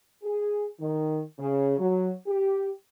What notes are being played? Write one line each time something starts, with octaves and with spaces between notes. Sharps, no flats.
G#4
D#3
C#3
F#3
G4